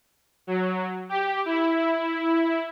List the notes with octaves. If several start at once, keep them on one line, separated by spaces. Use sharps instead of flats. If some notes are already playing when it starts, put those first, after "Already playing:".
F#3
G4
E4